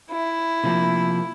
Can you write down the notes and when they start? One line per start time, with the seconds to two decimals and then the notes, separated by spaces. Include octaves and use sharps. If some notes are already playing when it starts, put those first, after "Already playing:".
0.10 E4
0.64 C3 F3 A#3